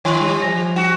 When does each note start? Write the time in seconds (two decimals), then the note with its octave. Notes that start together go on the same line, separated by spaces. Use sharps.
0.05 D#3 C#5 G#5 C6
0.21 G3
0.42 F3 G#5 A#6
0.76 F#4